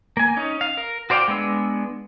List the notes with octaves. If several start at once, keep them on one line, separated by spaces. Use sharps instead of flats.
A#3 G#5
C#4 D#4
F5
A#4
F#4 C5 D5 F5 G5
G#3 B3 D4 E6